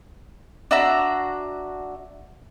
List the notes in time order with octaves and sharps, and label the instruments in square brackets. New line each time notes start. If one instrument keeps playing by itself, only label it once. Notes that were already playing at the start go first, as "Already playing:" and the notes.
[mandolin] D4 F#4 E5 A#5